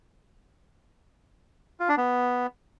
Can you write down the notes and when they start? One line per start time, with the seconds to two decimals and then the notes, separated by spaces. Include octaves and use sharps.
1.80 F4
1.89 D4
1.97 B3